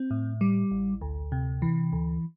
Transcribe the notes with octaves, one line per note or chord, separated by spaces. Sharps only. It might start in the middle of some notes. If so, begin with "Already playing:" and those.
Already playing: C4
A2
G3
A1
D2
C3
E3
D2